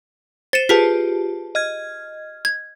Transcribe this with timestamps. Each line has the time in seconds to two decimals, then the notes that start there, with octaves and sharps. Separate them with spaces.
0.53 C5 A6 C#7 D#7 E7
0.69 F4 G4 G#4 B4 A5 B6
1.55 D#5 F6 G#6
2.45 G#6